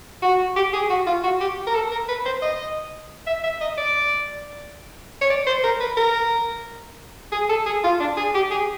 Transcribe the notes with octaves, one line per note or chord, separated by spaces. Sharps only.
F#4
G4
G#4
F#4
F4
F#4
G4
A#4
A4
A#4
B4
C5
D#5
E5
E5
D#5
D5
C#5
D5
C5
A#4
B4
A#4
G#4
A4
G#4
F4
D4
G#4
G4
G#4